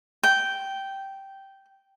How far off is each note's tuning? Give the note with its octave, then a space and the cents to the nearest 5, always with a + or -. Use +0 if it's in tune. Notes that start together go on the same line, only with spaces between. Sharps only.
G5 -10